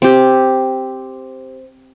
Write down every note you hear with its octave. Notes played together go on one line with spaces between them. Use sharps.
C4 G4